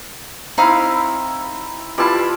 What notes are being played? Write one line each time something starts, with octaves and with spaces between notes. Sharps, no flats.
C4 D#4 E4 F5 B5
G3 E4 F4 B4 A5